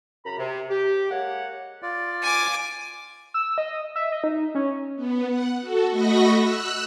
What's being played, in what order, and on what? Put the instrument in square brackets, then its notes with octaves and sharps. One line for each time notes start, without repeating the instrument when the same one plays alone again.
[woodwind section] F#2 C#3 A#5 B5
C3
G4
G#3 A#3 C#5 F#5
[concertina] F4 D5
[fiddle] G#5 D6
[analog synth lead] E6
D#5
E5
D#5
D#4
C#4
[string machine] B3
F#5
F#4 A4
A3 F#4 D#5 B5 C#6 A#6
E6 F#6